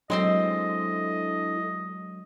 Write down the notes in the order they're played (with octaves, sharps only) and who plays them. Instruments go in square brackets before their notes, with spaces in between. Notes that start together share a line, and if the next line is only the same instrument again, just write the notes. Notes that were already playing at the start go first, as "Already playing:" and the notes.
[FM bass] F#3 [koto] G#3 C4 C5 [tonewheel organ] D4 E4 A4 [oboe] D#5